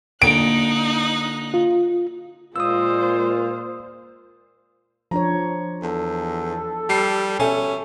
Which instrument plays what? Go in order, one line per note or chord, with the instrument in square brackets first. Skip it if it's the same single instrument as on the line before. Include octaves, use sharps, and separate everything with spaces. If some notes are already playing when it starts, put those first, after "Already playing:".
[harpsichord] A#2 D3 [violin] D#4 F#6 [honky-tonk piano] D7
[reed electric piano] F4
[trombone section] A#2 [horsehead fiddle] G#3 C5 [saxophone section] F4 [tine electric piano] D#6 E6
[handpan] F3 D4 C#5 [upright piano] A#5
[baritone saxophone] E2 [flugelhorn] A4
[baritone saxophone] G3 [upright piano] A5 C7
[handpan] B2 [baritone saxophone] C#4 [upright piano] A4 E5 G#5